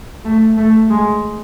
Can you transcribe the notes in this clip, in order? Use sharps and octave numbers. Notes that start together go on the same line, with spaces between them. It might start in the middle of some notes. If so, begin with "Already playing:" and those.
A3
A3
G#3